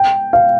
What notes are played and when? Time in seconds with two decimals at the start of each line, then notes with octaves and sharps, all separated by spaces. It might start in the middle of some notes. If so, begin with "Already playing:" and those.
Already playing: G5
0.33 F5